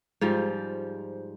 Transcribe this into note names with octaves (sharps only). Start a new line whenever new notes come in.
G#2 F3 G3